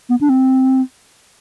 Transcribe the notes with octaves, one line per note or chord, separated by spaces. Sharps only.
B3
D4
C4